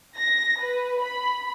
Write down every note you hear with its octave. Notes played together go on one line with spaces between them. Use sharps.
A#6
B4
B5